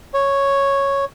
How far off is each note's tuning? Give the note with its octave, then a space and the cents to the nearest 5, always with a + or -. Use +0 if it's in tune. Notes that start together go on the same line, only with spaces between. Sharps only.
C#5 -5